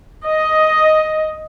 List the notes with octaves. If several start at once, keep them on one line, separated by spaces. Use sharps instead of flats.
D#5